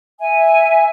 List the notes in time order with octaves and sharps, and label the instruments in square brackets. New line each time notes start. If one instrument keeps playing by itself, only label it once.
[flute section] E5 G#5